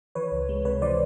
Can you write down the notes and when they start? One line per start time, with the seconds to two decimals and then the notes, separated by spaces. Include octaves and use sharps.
0.15 E3 B4 C#5
0.32 C#2
0.49 G#3
0.65 C3 B4 C#5
0.82 E3 C5 D5